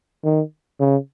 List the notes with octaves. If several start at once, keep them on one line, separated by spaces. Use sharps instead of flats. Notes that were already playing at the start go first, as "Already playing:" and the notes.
D#3
C#3